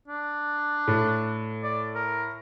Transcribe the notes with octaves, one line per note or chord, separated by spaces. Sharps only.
D4
A2
D5
A#4